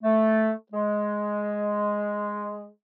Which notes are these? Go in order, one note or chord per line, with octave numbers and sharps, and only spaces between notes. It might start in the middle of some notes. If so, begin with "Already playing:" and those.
A3
G#3